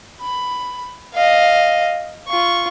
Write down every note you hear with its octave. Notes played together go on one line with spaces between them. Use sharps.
B5
D#5 F5
F4 C#6